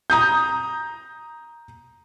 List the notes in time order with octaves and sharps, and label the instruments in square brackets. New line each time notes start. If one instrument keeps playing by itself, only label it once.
[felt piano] A#5 D#6 G6